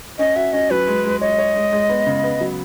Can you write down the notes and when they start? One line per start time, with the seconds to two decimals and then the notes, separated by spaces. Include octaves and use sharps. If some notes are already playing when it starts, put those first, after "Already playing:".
0.19 C#4 D#5
0.36 F#4 E5
0.53 C#4 D#5
0.71 F#3 B4
0.87 G#3
1.05 G#3
1.21 C#5 D#5
1.38 C#5
1.56 G#3
1.73 G#3
1.89 B3
2.07 C#3
2.24 B3
2.41 F#3